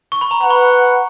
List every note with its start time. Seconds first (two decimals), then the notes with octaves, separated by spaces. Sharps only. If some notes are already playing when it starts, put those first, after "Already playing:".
0.12 C#6
0.21 B5
0.31 A#5
0.40 B4 F#5 B5
0.50 C#6